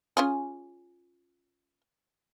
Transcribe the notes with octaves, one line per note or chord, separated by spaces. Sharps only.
C#4 F4 G#4